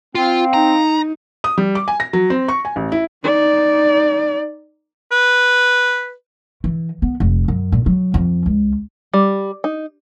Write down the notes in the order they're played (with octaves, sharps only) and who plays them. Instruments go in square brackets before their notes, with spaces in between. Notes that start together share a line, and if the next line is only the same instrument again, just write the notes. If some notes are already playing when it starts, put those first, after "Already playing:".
[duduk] C4 [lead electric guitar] F4 [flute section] F5 G5
[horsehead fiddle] D#4 [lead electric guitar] A#5
[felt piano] D#6
G3
D6
G#5
A#6
F#3
C4
C#6
G#5
A1
E4
[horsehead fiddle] D#4 D5
[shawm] B4
[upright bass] E3
B3
F1
F#2
A#2
F#3
F2
C#2
[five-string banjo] G3
D#4